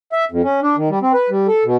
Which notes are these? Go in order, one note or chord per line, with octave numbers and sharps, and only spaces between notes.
E5
F2
C#4
D4
D#3
G3
C4
B4
G3
A4
B2